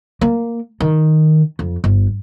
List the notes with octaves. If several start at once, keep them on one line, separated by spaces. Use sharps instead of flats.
A#3
D#3
F2
G1